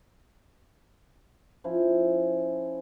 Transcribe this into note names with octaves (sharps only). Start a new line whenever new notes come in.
F3 C#4 E4